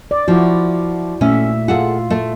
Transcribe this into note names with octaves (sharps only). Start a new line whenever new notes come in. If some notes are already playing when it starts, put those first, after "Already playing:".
D5
F3 E4 F#4
A#2 A3 C#4 E5
F4 G#4 A4 F#5
A3